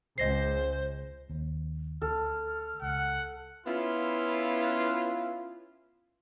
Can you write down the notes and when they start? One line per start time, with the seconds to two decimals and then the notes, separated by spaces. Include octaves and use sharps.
0.18 C#2 C5 D#5 A#6 C7
1.29 D#2
2.02 D2 A4 F6
2.82 C#2 F#5
3.66 B3 C#4 E4 F4